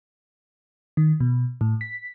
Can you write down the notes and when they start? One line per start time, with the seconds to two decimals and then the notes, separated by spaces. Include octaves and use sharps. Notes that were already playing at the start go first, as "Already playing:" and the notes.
0.97 D#3
1.20 B2
1.61 A2
1.81 B6